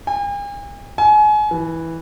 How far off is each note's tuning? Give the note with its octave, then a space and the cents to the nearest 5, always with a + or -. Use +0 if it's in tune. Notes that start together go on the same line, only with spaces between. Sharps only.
G#5 -45
G#5 +30
E3 -10